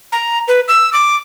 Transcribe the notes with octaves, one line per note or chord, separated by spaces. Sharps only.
A#5
B4
E6
D6